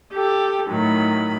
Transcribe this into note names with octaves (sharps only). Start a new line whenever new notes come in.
G4 A4
A2 D#3 F#3 B5